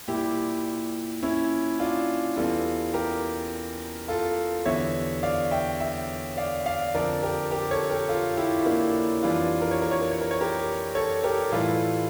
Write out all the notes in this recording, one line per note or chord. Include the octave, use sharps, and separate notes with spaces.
A#2 G3 E4 G4
C#4 E4
D4 F4
E2 E3 G3 F4 A4
G4 A#4
F4 A4
E2 D3 G3 C#5 E5
D5 F5
E5 G5
E5 G5
D5 F5
D5 F5
F2 D3 F3 A#4 D5
G4 A#4
G4 A#4
A4 C#5
G4 A#4
F4 A4
E4 G4
E4
A#3 D4
F2 E3 G3 D4 F4
A#4
C#5
A#4
C#5
A#4
C#5
A#4
C#5
G4 A#4
A4 C#5
G4 A#4
A2 E3 G3 F4 A4